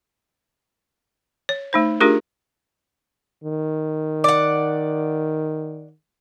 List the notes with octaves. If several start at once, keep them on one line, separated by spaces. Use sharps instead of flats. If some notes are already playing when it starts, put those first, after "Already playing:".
C#5
A3 D#4 C5
A3 D4 F4 G4 G#4 A#4
D#3
D5 F#5